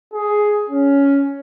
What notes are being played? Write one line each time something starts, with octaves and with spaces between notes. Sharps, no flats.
G#4
C#4